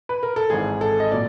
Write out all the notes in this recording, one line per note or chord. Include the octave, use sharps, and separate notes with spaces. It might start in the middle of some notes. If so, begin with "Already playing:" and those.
B4
A#4
A4
G#1 G#2 E3 G#3 G#4
A4
D#5
A#2 F#3 D5